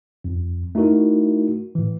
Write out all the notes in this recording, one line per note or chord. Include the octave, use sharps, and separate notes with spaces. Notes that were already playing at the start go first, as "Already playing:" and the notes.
F2
A3 D#4 E4 F#4 A#4
A2 E3